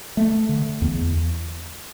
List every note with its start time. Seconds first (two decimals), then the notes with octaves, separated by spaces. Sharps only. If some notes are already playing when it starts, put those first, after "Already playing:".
0.17 A3
0.49 D3
0.82 E2